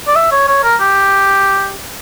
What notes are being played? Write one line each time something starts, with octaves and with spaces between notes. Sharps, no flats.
D5
E5
C#5
C#5
A#4
G4